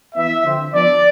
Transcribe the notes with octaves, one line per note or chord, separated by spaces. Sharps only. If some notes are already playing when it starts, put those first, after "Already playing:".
E3 B3 E4 E5
D3 F3 C4
F3 B3 D4 D5